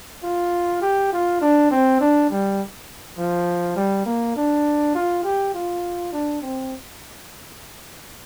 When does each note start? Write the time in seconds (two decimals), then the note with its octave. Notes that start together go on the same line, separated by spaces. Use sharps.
0.23 F4
0.82 G4
1.13 F4
1.41 D4
1.71 C4
2.01 D4
2.30 G3
3.18 F3
3.76 G3
4.06 A#3
4.36 D4
4.95 F4
5.24 G4
5.54 F4
6.13 D4
6.42 C4